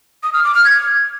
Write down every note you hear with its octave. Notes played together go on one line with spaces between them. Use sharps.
D#6
F6
D6
F6
G#6